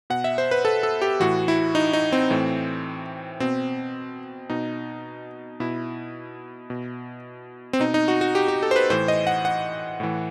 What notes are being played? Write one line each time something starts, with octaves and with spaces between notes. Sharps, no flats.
B2 F#5
E5
C5
B4
A4
A4
G4
A2 E3 F#4
E4
D#4
D#4
C4
A2 E3
B2 C4
B2 D#4
B2 E4
B2
C4
B2 D#4
D#4
F#4
F#4
G4
G4
A4
C5
B4
A2 E3 C5
D#5
F#5
F#5
A2 E3